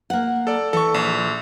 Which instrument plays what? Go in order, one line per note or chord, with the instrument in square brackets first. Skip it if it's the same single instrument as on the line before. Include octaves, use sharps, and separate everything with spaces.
[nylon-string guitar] A#3 F#5
[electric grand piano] A4 D5
[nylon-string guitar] E3 [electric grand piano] A4 C#6
[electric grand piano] A#1